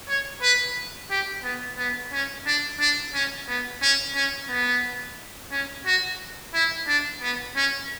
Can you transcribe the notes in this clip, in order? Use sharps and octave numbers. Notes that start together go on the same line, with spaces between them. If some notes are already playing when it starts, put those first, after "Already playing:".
C#5
B4
G4
B3
B3
C#4
D4
D4
C#4
B3
C#4
C#4
B3
C#4
F#4
E4
D4
B3
C#4